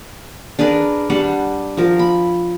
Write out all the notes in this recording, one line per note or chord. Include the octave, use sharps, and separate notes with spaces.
D4 G#4 A#4 B4
G3 D4 F#5
F3 A#4
B5